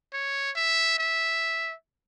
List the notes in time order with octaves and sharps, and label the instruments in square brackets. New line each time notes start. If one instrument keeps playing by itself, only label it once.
[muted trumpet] C#5
E5
E5